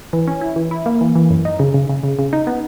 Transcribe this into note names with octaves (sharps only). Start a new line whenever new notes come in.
E3
C#4
E4
E3
E4
A#3
E3
E3
F#2
D#4
C#3
C#3
C#3
C#3
C#3
D#4
B3